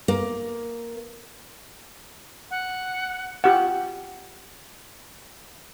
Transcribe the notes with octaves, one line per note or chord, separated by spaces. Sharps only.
A#3
F#5
F4 G4 F#5